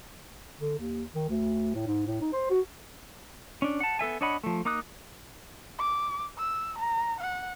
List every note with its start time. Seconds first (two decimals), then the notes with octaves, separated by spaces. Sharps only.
0.59 D3
0.79 D#2
1.15 D#3
1.29 D2
1.74 A2
1.87 G#2
2.07 A2
2.21 D#4
2.33 C5
2.50 F#4
3.62 C#4 D4
3.80 F#5 A5
3.99 B3 A4 E5 G#5
4.21 D4 C#5 D#5 F#5 B5
4.44 F3 A3
4.65 A#3 D#4 D6 D#6 F#6
5.79 D6
6.38 E6
6.79 A#5
7.21 F#5